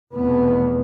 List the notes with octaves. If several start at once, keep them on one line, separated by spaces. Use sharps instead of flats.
F1 E2 B2 B3